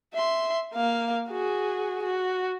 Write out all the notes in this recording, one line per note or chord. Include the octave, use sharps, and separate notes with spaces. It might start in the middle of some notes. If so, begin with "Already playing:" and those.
E5 C6
A#3 F5
F#4 G#4
F#4